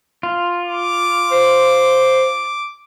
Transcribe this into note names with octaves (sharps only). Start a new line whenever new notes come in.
F4
D6
C5